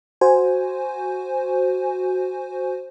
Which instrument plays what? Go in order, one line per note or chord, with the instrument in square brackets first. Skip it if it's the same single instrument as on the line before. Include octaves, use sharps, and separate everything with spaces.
[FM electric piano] F#4 C5 G#5